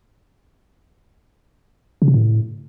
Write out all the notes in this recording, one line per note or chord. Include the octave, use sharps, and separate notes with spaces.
C#3
C3
A2